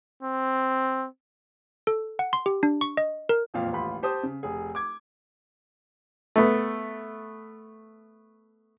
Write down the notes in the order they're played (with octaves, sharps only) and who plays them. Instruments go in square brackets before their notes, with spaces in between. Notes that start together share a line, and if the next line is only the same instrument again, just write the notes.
[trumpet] C4
[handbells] A4
F#5
C6
G4
D4
C#6
D#5
A#4
[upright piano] E1 F2 A#2 F5
D#1 A1 F4 B5 C6
G4 C5 A5 D#6
C#3
F1 G#4
D6 G#6
[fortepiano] A3 B3